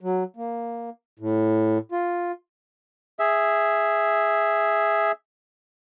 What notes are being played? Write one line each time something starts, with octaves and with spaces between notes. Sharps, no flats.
F#3
A#3
A2
F4
G#4 E5